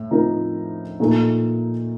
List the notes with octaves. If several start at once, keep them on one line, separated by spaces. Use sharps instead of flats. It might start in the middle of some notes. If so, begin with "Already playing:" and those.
Already playing: A2
A2 F3 C4 D#4 A#4
A#2 A3 D#4 A4